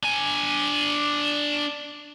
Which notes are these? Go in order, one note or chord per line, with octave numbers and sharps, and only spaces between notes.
D4 G#5